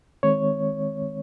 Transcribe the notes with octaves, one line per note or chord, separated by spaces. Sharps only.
D#3 G#3 C4 C#5